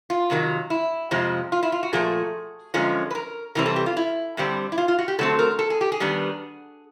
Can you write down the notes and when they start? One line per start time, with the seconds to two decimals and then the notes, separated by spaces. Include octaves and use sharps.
0.10 F4
0.30 F2 C3 D#3 F#3
0.70 E4
1.11 F2 C3 F3 G#3 C4
1.52 F4
1.63 E4
1.72 F4
1.83 F#4
1.93 A#2 F3 A3 G#4
2.74 F#2 D3 F3 G#3 C#4
3.10 B4
3.15 A#4
3.55 C3 E3 G3 C4 A#4
3.66 A4
3.76 G4
3.86 F4
3.97 E4
4.37 G2 D3 G3 C4
4.72 E4
4.78 F4
4.88 F4
4.99 F#4
5.08 G4
5.19 D3 F#3 A3 C4 A4
5.39 A#4
5.59 A4
5.70 G#4
5.81 G4
5.92 G#4
6.00 D#3 G3 B3 D4